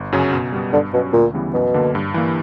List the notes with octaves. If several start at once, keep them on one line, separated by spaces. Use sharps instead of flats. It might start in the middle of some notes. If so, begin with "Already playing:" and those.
Already playing: G1
F#2 C#3 F#3 C#4
B2
G3 B3
G2 D3
B2 F#3 C#4 F#4
D2 A#2
C#3 E3 G3 B3
F#2 B2
D3 A#3 D4
G2
E3 A#3